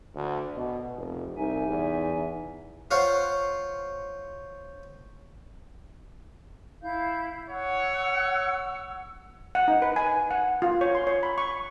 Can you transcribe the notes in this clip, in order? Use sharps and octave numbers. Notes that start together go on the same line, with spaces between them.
D2
B2
F1
C2 D#4 E5 G#5
E2
F4 C5 C#5 F5 F#5
E4 F5 G6
C#5 F#5 E6
F#5
D#4
B4
G#5
F#5
F4
C#5
C6
C#5
B5
C#6